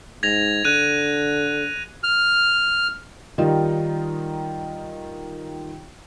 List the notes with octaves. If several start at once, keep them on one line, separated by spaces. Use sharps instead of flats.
G#2 G#6 A#6 F7
D3 F#6 D#7
F6
D#3 G3 D#4 F4